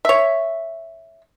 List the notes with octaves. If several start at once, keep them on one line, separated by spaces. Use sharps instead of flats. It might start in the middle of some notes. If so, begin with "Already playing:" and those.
C#5 E5